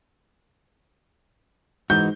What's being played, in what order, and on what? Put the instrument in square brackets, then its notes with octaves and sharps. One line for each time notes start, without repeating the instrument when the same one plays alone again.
[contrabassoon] G#2 [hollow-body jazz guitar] E3 D#4 F#4 [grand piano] G6